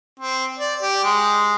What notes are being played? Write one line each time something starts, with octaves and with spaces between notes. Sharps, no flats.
C4
D5
G4
G#3